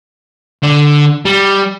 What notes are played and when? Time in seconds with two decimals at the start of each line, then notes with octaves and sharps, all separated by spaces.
0.63 D3
1.26 G3